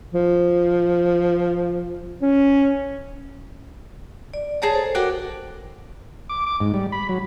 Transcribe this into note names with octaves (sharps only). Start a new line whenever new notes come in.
F3
C#4
D5
G#4 C#5 A5 A#5
A4 C5
F#4 G4 A#4 D5 F#5
D6
D6
G#2
G3
B5
F#3